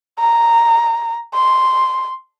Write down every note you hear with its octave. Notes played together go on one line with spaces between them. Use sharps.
A#5
C6